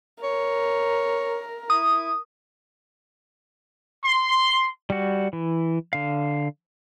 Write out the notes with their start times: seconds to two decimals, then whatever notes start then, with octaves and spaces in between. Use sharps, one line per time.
0.23 A#4 C#5
1.70 E4 D#6
4.05 C6
4.90 G3 F#4
5.33 E3
5.93 D3 F5